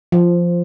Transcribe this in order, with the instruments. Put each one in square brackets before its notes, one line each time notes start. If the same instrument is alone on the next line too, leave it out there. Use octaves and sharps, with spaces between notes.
[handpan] F3